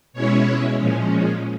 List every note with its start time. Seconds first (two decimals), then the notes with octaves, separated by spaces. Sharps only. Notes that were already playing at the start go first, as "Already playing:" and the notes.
0.13 B2 G#3 C#4 E4 C#5
0.76 A#2 F3 G#3 C#4